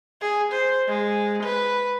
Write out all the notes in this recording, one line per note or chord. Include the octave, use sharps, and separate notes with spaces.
G#4
C5
G#3
B4